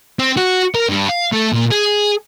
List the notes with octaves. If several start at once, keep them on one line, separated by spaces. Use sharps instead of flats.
C4
F#4
A#4
G2
F5
A3
A#2
G#4